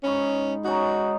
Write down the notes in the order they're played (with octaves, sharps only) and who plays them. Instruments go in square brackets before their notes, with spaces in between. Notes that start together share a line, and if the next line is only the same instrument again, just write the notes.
[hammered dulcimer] G#2 B5 C#6 [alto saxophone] C#4
[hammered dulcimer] C#4 D#4 [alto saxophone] F#4